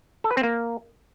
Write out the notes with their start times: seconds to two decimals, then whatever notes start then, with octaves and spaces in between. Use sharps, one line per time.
0.24 A4
0.31 B4
0.37 C4
0.43 A#3